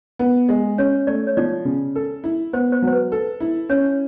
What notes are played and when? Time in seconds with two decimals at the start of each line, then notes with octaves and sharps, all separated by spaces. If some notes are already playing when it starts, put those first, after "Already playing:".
0.19 B3
0.49 G#3
0.78 C#4 C#5
1.07 A3 D5
1.27 C#5
1.37 F3 D5
1.65 C#3
1.95 A4
2.24 E4
2.53 B3 C5
2.72 C5
2.82 F#3 C5
2.93 B4
3.12 A4
3.40 E4
3.69 C#4 C#5